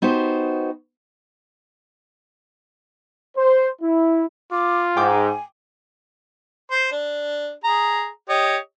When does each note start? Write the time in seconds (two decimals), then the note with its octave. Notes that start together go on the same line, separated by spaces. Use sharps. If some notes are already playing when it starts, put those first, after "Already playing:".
0.02 B3 D#4 F#4 G4 C5
3.36 C5
3.82 E4
4.52 F4 D6
4.97 G#2 G5 G#5 D6
6.71 C5
6.92 D4
7.64 G#4 A#5
8.29 G4 C#5 D#5